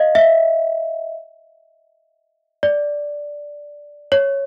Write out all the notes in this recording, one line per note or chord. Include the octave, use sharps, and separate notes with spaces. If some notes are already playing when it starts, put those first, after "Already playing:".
Already playing: D#5 F5
E5
D5
C#5